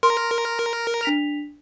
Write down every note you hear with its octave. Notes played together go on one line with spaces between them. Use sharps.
A#4 C6
D4 B6 F7